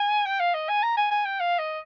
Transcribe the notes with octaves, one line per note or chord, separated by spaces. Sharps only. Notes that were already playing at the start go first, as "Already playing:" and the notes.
Already playing: G#5
G5
F5
D#5
G#5
A#5
G#5
G#5
G5
F5
D#5